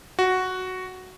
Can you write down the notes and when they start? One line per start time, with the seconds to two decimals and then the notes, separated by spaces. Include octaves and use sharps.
0.19 F#4